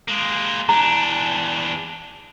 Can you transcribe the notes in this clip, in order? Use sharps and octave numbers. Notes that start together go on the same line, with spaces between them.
G#3 A#3
E2 D4 A#5